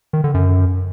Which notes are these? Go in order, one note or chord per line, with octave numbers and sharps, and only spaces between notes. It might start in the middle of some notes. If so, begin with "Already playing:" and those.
D#3
D3
F#2